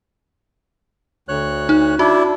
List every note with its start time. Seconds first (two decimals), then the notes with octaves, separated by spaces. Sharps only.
1.29 D2 C#5 F#6
1.69 D#4
1.99 D4 E4 F#4